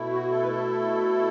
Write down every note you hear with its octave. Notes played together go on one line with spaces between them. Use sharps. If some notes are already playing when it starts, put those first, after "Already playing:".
Already playing: B2 A3 E4
F#4
A4
B4
A4